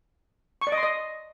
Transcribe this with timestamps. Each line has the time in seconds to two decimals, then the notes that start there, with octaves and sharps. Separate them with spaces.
0.61 C#6
0.67 D5
0.72 D#5
0.78 C6
0.83 D#5